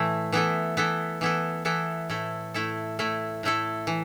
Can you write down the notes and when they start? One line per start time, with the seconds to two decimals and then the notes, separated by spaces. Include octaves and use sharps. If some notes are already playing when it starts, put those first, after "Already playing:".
Already playing: A2 E3 A3 E4
0.32 E3 B3 E4 A4
0.77 E3 B3 E4 A4
1.21 E3 B3 E4 A4
1.65 E3 B3 E4 A4
2.10 A2 A3 E4 A4
2.54 A2 A3 E4 A4
2.99 A2 A3 E4 A4
3.43 A2 A3 E4 A4
3.87 E3